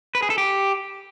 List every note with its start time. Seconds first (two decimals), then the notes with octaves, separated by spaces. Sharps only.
0.15 B4
0.22 G#4
0.30 A4
0.38 G4